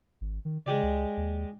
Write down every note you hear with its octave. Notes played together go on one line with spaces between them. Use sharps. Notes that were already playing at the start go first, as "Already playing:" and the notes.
G#1
D#3
C#3 G#3 G4 D5
C#2
D#2